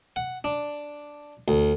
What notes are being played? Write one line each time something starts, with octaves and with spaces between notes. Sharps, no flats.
F#5
D4
D2